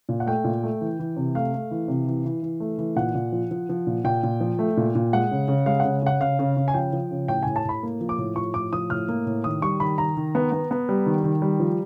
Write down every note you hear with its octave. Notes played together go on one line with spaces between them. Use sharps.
A#2
F#5
A3 G5
A#2
A3
E3
E3
C3
A3 F5
A3
E3
C3
E3
E3
E3
A3
E3
A#2 F#5
A#2
F3
F3
F3
A#2
A#2 G5
A#2
F3
A3
A#2
A#2
G#3 F#5
C#3
C#3
G#3 F5
C#3 F#5
C#3 F#5
C#3 F5
C#3
C#3
G#5
F3 G5
F3
C#3
A2 G5
A2 G#5
A5
A2 B5
A#3
F3
D6
A2
F3 C#6
A2 D6
F3 D#6
A2 F6
A#3
A2
D#3 D#6
G3 C#6
D#3 B5
D#3 A#5
D#3
B3
B3
B3
G3
D#3
D#3
G3
F3